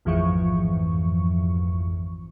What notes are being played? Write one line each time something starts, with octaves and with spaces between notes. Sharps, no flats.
A1 F2 G#2 E3 F3 C#6